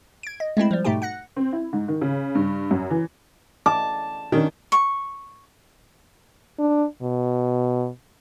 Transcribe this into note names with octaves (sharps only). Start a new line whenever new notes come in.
G#6 D7
D#5
G#3 A3 C4 E4
F3 G3
G#2 B2 A3 D#4 G4 G5
F#5 F#6 A#6 C#7
C4
E4
G#2
D#3
C#3
G2
F#2
E3
A5 D6
D#3 C#4 D4
C#6
D4
B2